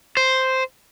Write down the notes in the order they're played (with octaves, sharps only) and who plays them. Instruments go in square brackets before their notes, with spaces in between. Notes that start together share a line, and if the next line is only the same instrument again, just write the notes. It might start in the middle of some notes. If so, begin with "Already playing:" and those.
[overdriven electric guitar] C5